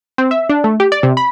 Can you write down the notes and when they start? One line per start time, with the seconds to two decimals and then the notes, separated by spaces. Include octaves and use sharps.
0.18 C4
0.31 E5
0.49 D4
0.64 A3
0.80 G4
0.92 D5
1.03 C3
1.17 B5